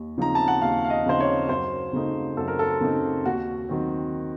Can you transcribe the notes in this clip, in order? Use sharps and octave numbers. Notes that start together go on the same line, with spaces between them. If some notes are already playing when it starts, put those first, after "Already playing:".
Already playing: D#2
C#3 F3 C4 D#4 A#5
A5
F#5
D#2 F5
F5
D#5
C#3 F3 C4 D#4 C5
C#5
F#2 C5
C#3 A3 C4 D#4
F#2 A4
A#4
A4
C#3 A3 C4 D#4
D#2 F#4
D#3 F#3 C4